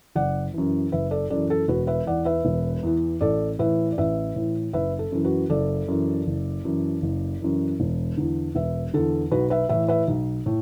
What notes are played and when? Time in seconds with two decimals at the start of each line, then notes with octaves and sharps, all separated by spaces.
0.15 F#1 D5 F#5
0.54 F#2 E3
0.92 F#1 B4 E5
1.11 A4 D5
1.30 F#2 E3 A4 D5
1.50 A4
1.68 E1 F#4 B4
1.87 B4 E5
2.06 E2 E3 D5 F#5
2.25 B4 E5
2.45 E1
2.83 E2 E3
3.21 A1 A4 D5
3.59 A2 E3 B4 E5
3.92 D5
3.98 A1 B4 E5
4.36 A2 E3
4.73 F#1 B4 E5
4.99 A4
5.12 F#2 E3
5.25 F#4 B4
5.50 F#1 A4 D5
5.88 F#2 E3
6.27 F#1
6.65 F#2 E3
7.02 F#1
7.42 F#2 E3
7.80 E1
8.17 E2 D3
8.55 E1 B4 E5
8.94 E2 D3 A4
9.31 B1 F#4 B4
9.50 B4 E5
9.69 A2 E3 B4 E5
9.88 B4 E5
10.07 B1
10.46 A2